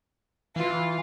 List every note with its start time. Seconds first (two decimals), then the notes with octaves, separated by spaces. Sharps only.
0.56 E3 F4